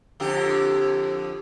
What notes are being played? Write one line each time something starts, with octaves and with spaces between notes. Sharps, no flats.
F2 D3 G4